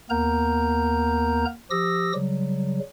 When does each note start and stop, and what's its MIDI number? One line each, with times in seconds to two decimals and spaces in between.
0.10 1.45 39
0.10 1.45 58
0.10 1.45 59
0.10 1.45 70
0.10 1.45 82
0.10 1.45 91
1.71 2.13 53
1.71 2.13 67
1.71 2.13 87
1.71 2.13 88
1.71 2.13 94
2.15 2.79 49
2.15 2.79 54
2.15 2.79 55